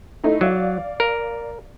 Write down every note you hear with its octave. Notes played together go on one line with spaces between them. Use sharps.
A3 D#4 E4
F#3 D5 F5
A#4